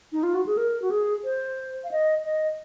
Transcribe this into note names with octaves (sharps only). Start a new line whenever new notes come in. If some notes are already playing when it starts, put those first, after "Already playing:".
D#4
F4
F#4
G#4
A#4
F#4
G#4
C5
F5
D#5
D#5